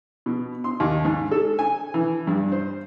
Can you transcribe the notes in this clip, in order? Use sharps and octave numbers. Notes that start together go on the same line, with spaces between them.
B2
C6
D#2
G#2
A4
G#5
E3
G2
C5